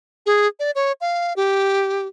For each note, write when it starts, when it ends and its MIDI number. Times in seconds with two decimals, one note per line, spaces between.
0.26 0.47 68
0.60 0.71 74
0.75 0.92 73
1.01 1.33 77
1.36 2.07 67